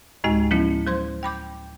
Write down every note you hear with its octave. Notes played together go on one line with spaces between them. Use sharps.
D2 A2 G#3 D#4 F#4 G#5
F3 F#3 B3 C#4 E4
F#3 C5 C6 G#6
G5 B5 D6 G6